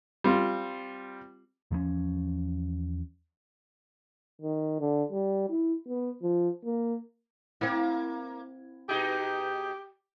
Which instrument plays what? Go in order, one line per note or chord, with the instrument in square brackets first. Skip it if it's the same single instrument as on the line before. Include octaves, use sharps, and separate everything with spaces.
[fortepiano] G3 C4 F4
[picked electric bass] E2 F3 G3 C#4
[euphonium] D#3
D3
G3
E4
B3
F3
A#3
[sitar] A#3 [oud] C4 E4
[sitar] B2 D#4 G#4 [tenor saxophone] G4